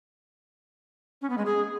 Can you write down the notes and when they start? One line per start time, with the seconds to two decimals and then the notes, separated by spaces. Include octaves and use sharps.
1.22 C#4
1.30 B3
1.38 G#3
1.46 G#4